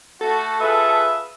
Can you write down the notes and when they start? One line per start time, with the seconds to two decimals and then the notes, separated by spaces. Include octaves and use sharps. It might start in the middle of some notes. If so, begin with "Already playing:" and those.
0.21 A3 F#4 A4
0.61 F4 G#4 B4 E5